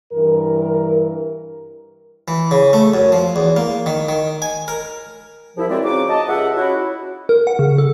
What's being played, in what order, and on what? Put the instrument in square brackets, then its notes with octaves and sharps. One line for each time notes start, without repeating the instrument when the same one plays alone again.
[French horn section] G2 E3 A#4
[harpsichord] E3
C#3
A3
F#2
F3
E2
A#3
D#3
D#3
G#5
A#4
[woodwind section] C2 F3 E4
E3 F#3 G#3 C4 F#4 D5
C#3 F3 D#4 F#4 D6
D#5 A5
C#2 G4 E5 F#5
C#4 E4 F#4
[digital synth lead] A#4
F#5
C#3
A4